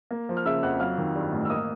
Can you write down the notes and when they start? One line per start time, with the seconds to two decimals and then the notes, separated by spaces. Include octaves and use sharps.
0.11 A#3
0.29 F3
0.37 F6
0.45 C#3 E5 E6
0.63 F2 F#5 F#6
0.80 F#3 F5 F6
0.98 D#3
1.15 G2
1.32 A1
1.45 E6
1.49 A#3 D#5 D#6